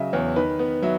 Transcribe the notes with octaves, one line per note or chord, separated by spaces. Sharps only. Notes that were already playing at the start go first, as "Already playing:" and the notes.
Already playing: C#3 F#3 C#4 D#5 E5
E2 C#5
D#3 B4
B3
F#3 E5